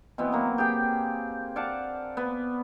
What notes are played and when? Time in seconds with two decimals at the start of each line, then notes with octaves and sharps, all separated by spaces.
0.18 B2 E3 B3 C4
0.32 F#3 A#3
0.58 G4 G#4 G5
1.56 D5 F5 F#5 A5
2.17 B3